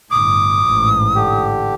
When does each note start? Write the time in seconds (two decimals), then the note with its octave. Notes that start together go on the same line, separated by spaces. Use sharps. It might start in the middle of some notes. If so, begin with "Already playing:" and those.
0.11 G1 A2 D6 D#6
0.66 A1 G#2
1.15 D3 G4